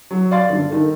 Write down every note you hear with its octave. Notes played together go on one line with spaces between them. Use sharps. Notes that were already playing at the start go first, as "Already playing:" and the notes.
F#3
D5 F5 C6 A6
G1 D3
D#3 A4